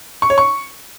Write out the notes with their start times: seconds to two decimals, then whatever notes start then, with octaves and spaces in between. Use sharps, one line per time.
0.22 C#6
0.30 C#5
0.38 C#6